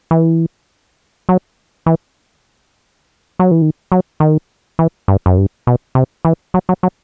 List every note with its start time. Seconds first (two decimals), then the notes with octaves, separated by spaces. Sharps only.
0.11 E3
1.29 F#3
1.86 E3
3.39 F#3
3.51 E3
3.62 D#3
3.92 F#3
4.20 D#3
4.79 E3
5.08 G2
5.26 F#2
5.38 G2
5.67 B2
5.95 C3
6.25 E3
6.54 F#3
6.69 F#3
6.83 F#3